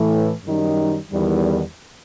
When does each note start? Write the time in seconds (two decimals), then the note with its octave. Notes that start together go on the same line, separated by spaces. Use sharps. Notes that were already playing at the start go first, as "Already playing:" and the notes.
Already playing: A2 E3 A3
0.44 F#2 D#3 G3 D#4
1.10 E2 D#3 G3